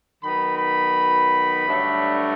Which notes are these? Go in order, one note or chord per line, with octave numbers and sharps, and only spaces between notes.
D#3 F#3 B3 B5
B5
G2 D3 F#3 A3